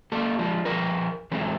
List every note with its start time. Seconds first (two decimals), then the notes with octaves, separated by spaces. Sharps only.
0.12 A#3 G4 A4 A5
0.39 F3 G#3 D4
0.65 F3 G#4 A#4 B4
1.31 E3 F#3 G#3 A3 C4